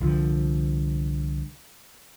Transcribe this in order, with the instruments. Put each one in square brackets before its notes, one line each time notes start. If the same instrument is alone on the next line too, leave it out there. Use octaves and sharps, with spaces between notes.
[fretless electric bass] C2 D3 F3